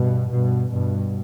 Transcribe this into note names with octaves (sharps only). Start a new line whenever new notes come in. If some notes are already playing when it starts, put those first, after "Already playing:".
Already playing: G2 B2
G2 B2
G2 B2